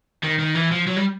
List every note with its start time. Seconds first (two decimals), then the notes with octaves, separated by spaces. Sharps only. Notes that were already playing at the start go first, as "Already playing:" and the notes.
0.24 D#3
0.39 D#3
0.55 E3
0.72 F3
0.87 F#3
0.97 G3